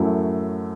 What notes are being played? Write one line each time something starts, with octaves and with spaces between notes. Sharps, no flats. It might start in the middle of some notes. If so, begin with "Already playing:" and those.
Already playing: F#2 F#3 A3 E4